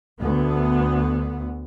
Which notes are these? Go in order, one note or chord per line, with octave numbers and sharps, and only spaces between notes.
D2 B3